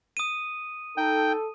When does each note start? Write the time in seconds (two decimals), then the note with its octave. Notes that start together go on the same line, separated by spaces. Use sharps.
0.17 D#6 D#7
0.97 D#4 A4 G5